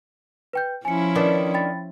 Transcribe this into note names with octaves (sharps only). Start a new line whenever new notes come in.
B4 G5 G6
F3 C#4 E4 G#5 C#7
D#3 D4 B4 C#5
G5 B5 A6